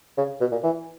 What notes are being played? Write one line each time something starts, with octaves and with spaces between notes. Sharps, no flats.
C#3
B2
A#2
E3